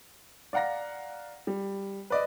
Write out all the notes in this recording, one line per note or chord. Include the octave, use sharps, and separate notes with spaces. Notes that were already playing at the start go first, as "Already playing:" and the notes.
D5 F5 F#5 A#5 A#6
G3
B4 D5 D#5